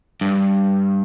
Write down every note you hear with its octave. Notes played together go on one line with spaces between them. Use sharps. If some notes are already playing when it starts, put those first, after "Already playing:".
G2